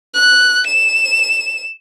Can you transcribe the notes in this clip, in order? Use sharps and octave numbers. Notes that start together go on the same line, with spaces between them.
F#6
E7